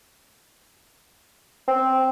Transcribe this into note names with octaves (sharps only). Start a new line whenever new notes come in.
C4